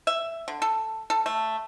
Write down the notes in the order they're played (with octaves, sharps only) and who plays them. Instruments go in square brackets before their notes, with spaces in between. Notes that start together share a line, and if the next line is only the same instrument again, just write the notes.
[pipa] E5
D3
A4
A4
A3